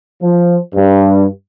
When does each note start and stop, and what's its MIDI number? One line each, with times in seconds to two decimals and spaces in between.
0.22 0.56 53
0.75 1.24 43